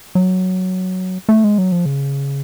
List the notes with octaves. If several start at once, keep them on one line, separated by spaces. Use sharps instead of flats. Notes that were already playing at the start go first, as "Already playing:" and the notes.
F#3
A3
G#3
F#3
F3
C#3